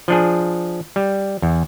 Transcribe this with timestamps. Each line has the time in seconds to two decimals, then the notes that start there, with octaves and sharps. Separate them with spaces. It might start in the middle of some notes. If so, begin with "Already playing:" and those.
0.08 F3 D4 G#4
0.96 G3
1.42 E2